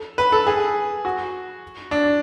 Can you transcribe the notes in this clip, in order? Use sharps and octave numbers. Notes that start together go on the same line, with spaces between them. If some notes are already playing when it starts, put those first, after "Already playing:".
Already playing: A4
B4
A4
G#4
F#4
D4